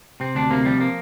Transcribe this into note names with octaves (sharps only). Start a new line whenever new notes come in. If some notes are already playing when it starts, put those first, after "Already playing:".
C3 C4
D2 D4
C3 A#3
F3 G3
A#3